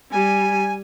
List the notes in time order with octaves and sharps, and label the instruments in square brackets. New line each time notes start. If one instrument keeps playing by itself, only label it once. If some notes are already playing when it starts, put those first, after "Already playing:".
[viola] G3 [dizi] G#5